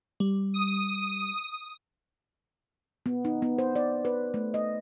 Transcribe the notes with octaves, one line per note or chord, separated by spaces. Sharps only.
G3
D#6
B3
D#4
B3
C5
D5
B4
A3
D#5